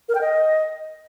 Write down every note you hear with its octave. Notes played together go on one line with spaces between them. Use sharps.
A#4
G5
D#5